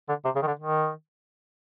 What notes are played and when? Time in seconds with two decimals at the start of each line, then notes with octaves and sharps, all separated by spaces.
0.09 D3
0.25 C3
0.35 C#3
0.42 D#3
0.47 D3
0.59 D#3